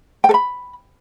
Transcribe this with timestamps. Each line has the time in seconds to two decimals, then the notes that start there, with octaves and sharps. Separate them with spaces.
0.24 G5
0.29 A4
0.34 B5